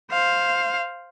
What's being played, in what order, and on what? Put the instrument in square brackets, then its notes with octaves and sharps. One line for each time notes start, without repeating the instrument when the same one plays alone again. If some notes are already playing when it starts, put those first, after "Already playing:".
[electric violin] C5 F5